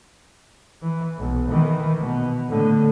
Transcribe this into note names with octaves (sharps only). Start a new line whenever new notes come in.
E3
B1
D#3 E3
B2
A2 D3